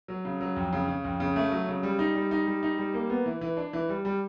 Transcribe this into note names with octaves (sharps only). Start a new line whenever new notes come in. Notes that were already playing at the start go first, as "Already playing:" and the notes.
F#3
C#3
F#3
F2
C#3
C#3
F2
C#3
A3
F#3
C#3
G3
D#4
G3
D#4
G3
D#4
G3
A#3
B3
E3
E3
D4
E3
G3
G3